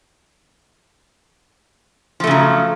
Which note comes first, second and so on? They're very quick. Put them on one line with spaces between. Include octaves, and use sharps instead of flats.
F3 A3 C#3 F#3